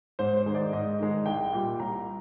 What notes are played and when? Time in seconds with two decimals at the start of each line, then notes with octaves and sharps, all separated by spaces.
0.19 G#2 C5
0.37 C5
0.46 D#3 G#3
0.55 D5
0.73 G#2 D#5
0.99 D#3 G#3
1.26 C2 G5
1.53 A#2 G3
1.79 C2 A#5